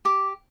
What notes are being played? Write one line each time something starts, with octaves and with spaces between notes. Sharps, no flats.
G4 D6